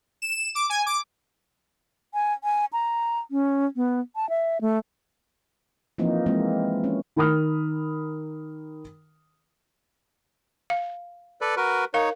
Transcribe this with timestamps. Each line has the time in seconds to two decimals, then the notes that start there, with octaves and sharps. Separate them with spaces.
0.22 E7
0.55 D6
0.70 G#5
0.86 D6
2.14 G#5
2.44 G#5
2.73 A#5
3.31 C#4
3.76 B3
4.16 A5
4.29 E5
4.61 A3
5.98 E3 F3 A#3 C4 D#4
6.26 E3 G#3 A#3 C4
6.84 C#4
7.16 D#3 A#4 B5 D#6 F6
10.70 F5
11.41 A4 B4 D5
11.57 F#4 A#4 B4
11.94 D#4 A#4 C#5 F5